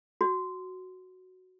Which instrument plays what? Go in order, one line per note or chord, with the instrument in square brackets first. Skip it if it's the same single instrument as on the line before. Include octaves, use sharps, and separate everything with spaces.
[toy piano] F#4